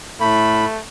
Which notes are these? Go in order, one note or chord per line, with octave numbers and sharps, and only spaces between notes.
A2 A3 B5